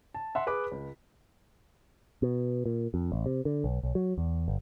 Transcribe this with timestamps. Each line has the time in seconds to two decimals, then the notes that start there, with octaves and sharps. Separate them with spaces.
0.14 A5
0.35 E5 F#5 C6
0.47 G#4 B4 B5 D6 B6
0.71 C#2
2.22 B2
2.66 A#2
2.94 F2
3.12 A1
3.26 C3
3.45 D3
3.64 B1
3.83 B1
3.95 F#3
4.18 E2
4.48 G1